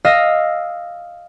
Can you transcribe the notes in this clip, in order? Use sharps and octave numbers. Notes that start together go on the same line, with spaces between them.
D#5 F5 E6 A#6